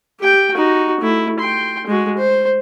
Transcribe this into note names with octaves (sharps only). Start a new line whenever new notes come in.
G4 G5
D#4 F#4
A3 E4
G5 C6
G#3 F#4
C5